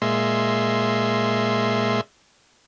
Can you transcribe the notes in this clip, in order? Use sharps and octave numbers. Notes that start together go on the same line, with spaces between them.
A#2 G#3 E5 C6